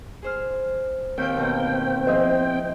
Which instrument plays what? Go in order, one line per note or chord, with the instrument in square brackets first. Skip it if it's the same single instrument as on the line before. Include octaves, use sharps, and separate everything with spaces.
[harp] G#4 C5 F6
[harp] D#2 F5 G6 [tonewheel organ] C4 G5
[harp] B2 B3 A#5
[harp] F3 E4 G#4 [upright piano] C5 D#5